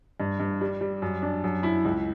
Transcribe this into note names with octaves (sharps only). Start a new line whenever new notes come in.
G2
G2
G3
G3
F#2
D4
F#2
E4
C#2